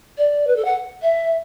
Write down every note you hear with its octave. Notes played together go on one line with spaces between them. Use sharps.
D5
B4
A4
F#5
E5